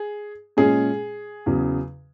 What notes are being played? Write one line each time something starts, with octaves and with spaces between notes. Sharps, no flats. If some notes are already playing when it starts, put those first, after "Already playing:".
Already playing: G#4
A#2 G#3 C#4 G#4
E2 C#3 F#3